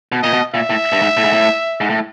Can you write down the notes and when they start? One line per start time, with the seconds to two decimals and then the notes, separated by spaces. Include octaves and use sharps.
0.12 B2
0.22 A#2 D#5
0.33 B2
0.54 A#2 E5
0.70 A2
0.92 G2
1.02 G#2
1.17 A2
1.25 G#2
1.33 A2
1.81 G#2
1.90 A2